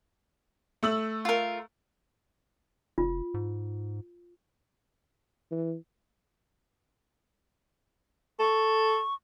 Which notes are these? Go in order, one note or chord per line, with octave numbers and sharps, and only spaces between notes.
A3 E6 F#7
F4 A#4
F1 F4
G#2
E3
A4 C#6